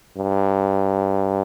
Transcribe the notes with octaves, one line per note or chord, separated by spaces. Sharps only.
G2